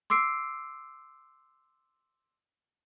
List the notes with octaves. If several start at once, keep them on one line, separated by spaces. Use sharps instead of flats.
C6 D6 E6 C7 D7